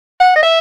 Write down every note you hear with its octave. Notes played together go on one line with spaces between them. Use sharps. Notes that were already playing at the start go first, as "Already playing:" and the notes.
F#5
D#5
E5